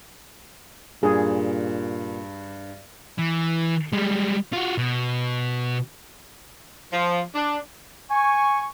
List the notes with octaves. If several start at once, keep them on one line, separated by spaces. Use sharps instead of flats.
G2 A#2 G#4
E3
G3 G#3
F4 F#4
B2
F3
D4
G#5 C#6